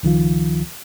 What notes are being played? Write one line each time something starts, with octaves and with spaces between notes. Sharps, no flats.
C#2 D#3 F3 F4